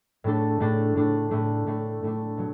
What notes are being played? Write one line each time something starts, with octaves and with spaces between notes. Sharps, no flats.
A2 A3 D4 A4
A2 A3 D4 A4
A2 A3 D4
A2 A3 D4
A2 A3 D4
A2 A3 D4
B2 F#3